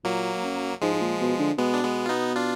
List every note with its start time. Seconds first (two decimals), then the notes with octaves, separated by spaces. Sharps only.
0.05 A#2 F#3 A#3
0.44 F#2
0.81 G#2 F3 G#3
0.94 G#2
1.01 A#2
1.21 B2
1.39 D3
1.58 B2 G#3 B3
1.74 D4
1.84 G#3 B3
2.06 F4
2.09 B3 D#4
2.36 D4 F4